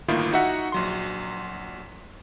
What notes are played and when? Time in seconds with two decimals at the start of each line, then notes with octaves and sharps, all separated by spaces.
0.08 G1 A2 D#3 A#3 E4 F4
0.33 D#4 F#4 E5 F#5
0.72 A#1 F#3 C6